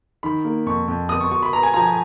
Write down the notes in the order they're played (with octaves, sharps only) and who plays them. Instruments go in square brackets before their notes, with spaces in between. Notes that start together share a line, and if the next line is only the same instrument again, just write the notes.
[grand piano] D#3 [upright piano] B5
[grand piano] A#3
[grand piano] F2 [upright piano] C#6
[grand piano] F2
[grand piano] B3 [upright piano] D#6
[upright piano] C#6
[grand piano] F#4 [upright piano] C#6
[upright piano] B5
[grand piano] B4 [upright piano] A#5
[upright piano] G#5
[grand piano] F3 [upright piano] A#5